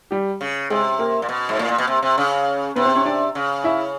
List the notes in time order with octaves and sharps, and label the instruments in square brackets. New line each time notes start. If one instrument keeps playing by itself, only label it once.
[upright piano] G3 G4
[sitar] C#3
[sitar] C3 [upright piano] G#3 G#4
[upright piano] A#3 A#4
[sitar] A#2
B2
G#2
[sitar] A2 [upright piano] A#3 A#4
[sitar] A#2
B2
C3
C3
C#3
[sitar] C3 [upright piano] B3 B4
[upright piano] C4 C5
C#4 C#5
D4 D5
[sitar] C#3
[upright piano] E4 E5